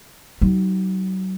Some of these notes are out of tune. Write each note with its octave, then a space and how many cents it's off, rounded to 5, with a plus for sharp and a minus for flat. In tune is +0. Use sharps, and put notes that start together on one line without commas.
F#3 +35 D#4 +0